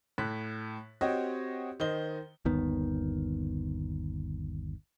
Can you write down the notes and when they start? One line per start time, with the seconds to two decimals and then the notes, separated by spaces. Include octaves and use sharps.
0.18 A2 F#6 B6
1.01 C4 F#4 G4 C#5 D#5
1.80 D#3 C5 D#5 G7
2.45 G1 D#2 D#3 B3